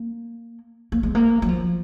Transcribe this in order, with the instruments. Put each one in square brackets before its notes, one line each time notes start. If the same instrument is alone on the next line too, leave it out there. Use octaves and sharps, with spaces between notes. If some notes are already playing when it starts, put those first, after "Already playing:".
Already playing: [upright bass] A#3
A#3
G#3
A#3
F#3
F3